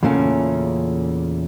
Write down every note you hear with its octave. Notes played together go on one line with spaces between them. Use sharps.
E2 A#2 C#3 A3 A#3 C#4